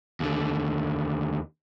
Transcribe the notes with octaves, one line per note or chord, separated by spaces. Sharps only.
D#2 D3